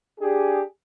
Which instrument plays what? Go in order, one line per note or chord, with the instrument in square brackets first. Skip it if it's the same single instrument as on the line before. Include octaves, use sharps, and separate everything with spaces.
[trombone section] D4 G4 G#4